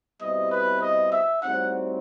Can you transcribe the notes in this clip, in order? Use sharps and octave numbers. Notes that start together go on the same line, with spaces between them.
B2 G3 C4 E4 G4 D#5
B4
D#5
E5
A2 G3 C4 D#4 F#4 F#5